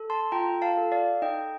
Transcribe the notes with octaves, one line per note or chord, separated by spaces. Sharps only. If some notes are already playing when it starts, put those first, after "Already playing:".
Already playing: A4
A5 C6
F4 G5 A#5
F5 A5
A4
D5 F5
D#4 D#5 G5